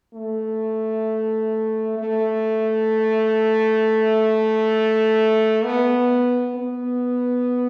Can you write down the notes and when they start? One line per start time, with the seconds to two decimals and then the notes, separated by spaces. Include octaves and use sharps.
0.14 A3
1.98 A3
5.65 B3
6.55 B3